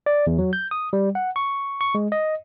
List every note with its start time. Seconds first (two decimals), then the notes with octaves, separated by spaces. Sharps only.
0.06 D5
0.27 E2
0.39 F#3
0.53 G6
0.71 D#6
0.93 G3
1.15 F#5
1.36 C#6
1.81 C#6
1.95 G#3
2.12 D#5